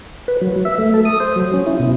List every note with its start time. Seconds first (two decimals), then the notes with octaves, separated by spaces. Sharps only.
0.28 B4
0.41 F#3
0.65 E5
0.78 A3
0.94 A4
1.05 D#6
1.20 C5
1.36 F#3
1.54 C#4
1.66 E4
1.80 B2